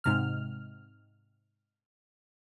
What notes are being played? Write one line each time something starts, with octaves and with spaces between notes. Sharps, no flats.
G#2 C3 F6